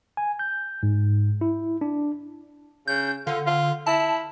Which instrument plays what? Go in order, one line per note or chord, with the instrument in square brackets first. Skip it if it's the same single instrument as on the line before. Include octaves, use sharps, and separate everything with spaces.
[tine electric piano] G#5
G6
G#2
E4
D4
[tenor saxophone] C#3 [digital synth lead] G6
[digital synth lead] D3 [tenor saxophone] F4
[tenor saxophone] F4
[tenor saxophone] E4 [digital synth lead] A5